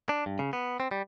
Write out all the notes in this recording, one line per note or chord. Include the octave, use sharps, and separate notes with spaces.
D4
G2
C#3
B3
C4
G3